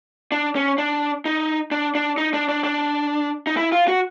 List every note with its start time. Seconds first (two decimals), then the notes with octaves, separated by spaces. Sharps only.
0.32 D4
0.55 C#4
0.78 D4
1.25 D#4
1.71 D4
1.95 D4
2.18 D#4
2.34 D4
2.49 D4
2.64 D4
3.47 D#4
3.57 E4
3.72 F4
3.88 F#4